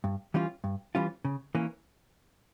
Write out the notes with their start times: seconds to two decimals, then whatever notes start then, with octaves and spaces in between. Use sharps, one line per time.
0.04 G2
0.34 E3 G3 C#4 F4
0.64 G2
0.95 E3 G3 C#4 F4
1.25 C#3
1.55 E3 A#3 C#4